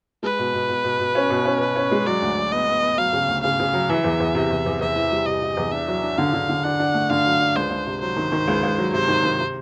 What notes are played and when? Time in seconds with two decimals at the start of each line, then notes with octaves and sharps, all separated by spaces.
0.23 G#3 B4
0.39 B2
0.54 B2
0.69 B2
0.84 B2
0.99 B2
1.15 C#4
1.30 B2
1.45 C#4
1.60 B2 B4
1.76 C#4
1.91 G#3
2.06 F#3 D5
2.22 D2
2.37 F#3
2.52 B3 D#5
2.68 B3
2.82 B3
2.98 F#3 F5
3.13 C#3
3.28 D2
3.43 C#3 F5
3.60 C#3
3.74 F#3
3.89 E3 E5
4.04 E2
4.20 E2
4.35 C3
4.50 E2
4.66 E2
4.81 E2 E5
4.96 E3
5.12 G3
5.26 C3 D#5
5.42 C3
5.57 E2
5.72 D4 E5
5.88 F#3
6.03 D4
6.18 D3 F5
6.34 D3
6.49 D3
6.64 D4 F#5
6.80 D4
6.94 A3
7.10 D3 F5
7.26 F#3
7.40 D4
7.56 C#2 C5
7.70 C#2
7.86 C3
8.02 F#3 C5
8.17 D#3
8.32 D#3
8.48 C#2
8.63 C#2
8.78 F#3
8.93 C3 C5
9.08 D#3
9.23 D#3
9.39 C3